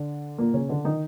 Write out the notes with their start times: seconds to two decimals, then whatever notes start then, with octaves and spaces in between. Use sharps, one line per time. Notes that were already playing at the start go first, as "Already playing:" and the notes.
Already playing: D3 D4
0.38 A#2 A#3
0.54 C#3 C#4
0.69 D3 D4
0.84 D#3 D#4